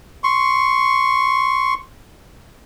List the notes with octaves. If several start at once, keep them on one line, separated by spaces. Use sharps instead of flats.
C6 C#6